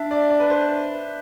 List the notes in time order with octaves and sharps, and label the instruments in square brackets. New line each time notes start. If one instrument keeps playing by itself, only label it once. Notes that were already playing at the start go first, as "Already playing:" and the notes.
Already playing: [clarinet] D4 [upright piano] E5
[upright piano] D5
D5
B4
C5